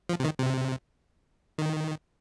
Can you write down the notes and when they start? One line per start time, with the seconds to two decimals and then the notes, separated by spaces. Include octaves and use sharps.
0.09 F3
0.20 C3
0.24 D#3
0.39 C3
1.58 D#3